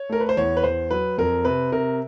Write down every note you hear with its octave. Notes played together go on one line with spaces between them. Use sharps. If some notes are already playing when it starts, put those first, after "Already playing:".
Already playing: C#5
A3 A#4
B4
C5
E2 C#5
B4
E2 C5
F#3 B4
F2 A#4
C3 B4
C3 A#4